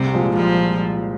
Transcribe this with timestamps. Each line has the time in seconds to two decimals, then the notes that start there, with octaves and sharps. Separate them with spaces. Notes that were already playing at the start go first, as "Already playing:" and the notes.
Already playing: C2 C3
0.13 A#2 F3 G#3
0.36 C2 F3